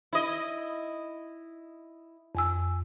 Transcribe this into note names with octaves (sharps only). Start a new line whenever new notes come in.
E4 D#5
F2 G#5 E6